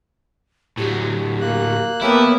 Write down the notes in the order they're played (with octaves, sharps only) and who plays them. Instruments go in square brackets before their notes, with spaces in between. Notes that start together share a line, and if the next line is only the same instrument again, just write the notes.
[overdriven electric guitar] A2 F#3 [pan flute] G4
[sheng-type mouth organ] A#3 F#6
[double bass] A#3 B3 [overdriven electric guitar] E4 [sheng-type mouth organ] G4 A4 B4 [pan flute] C#5